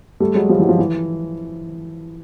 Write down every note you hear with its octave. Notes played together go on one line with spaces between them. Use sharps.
G3 A3
F#3 G#3
F3 G3
E3 F#3
F3
E3